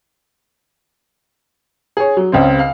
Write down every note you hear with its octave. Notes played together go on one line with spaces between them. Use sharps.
G#4 C#5
F#3
C#2 C#3 C4
F5